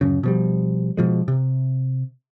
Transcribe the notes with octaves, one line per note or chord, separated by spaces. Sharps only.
D1 F#2 C#3
B2 F3 G3
B2 F3 G#3
C3